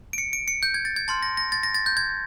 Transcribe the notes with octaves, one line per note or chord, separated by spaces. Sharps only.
D7
C#7
D7
C#7
G6
G#6
A6
G#6
A5 C6 F6 A6
A#6
A#6
A6
A#6
A6
G6
G#6